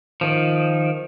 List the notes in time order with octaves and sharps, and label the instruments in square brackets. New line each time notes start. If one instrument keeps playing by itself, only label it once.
[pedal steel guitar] D#3 F3